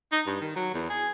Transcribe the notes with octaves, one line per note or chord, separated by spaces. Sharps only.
D#4
G2
D#3
F#3
E2
G#4